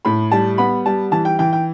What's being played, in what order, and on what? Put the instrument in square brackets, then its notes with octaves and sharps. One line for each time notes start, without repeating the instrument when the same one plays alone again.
[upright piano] A2 B5
G3 A5
B3 B5
G3 A5
E3 A5
G5
E3 G5
G5